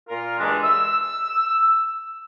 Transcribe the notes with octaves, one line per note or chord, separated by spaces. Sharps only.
A#2 F4 A#4
G2 E3 G#3 D4
E6